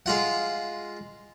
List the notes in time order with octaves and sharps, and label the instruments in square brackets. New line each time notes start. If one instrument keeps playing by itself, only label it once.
[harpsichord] G#3 F4 F#5